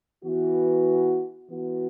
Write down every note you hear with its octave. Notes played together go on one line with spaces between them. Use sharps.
E3 B3 F#4
E3 B3 F#4